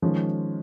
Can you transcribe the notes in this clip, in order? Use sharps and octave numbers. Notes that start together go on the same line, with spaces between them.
D#3 F3 G#3 C#4